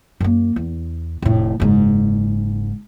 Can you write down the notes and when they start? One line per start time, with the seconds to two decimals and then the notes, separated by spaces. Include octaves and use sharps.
0.20 F#2 A#3
0.56 E2
1.22 F1 A2
1.60 F#1 G#2